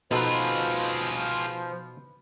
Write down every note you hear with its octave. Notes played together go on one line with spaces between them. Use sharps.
B2 F3 D#4 F4 G#4 A4 B4